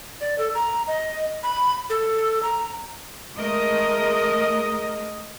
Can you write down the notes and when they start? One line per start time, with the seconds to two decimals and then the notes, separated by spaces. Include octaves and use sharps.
0.21 D5
0.39 A4
0.55 A#5
0.87 D#5
1.43 B5
1.90 A4
2.43 A#5
3.37 G#3 A3 A#4 D#5